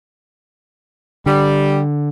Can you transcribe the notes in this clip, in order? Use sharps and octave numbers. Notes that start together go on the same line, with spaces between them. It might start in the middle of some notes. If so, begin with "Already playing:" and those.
D3 G3